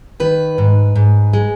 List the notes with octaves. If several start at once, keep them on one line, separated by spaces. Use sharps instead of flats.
D#3 B4
G#2
G#2
G#3